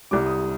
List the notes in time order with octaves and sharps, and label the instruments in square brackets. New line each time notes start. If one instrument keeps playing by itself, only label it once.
[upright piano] C2 C3 G3 D6
D#6